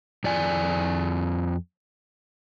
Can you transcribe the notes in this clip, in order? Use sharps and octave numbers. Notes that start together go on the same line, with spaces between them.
F2 D5 G#5